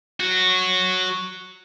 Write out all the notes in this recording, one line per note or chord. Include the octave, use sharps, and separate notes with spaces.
F#3 F#4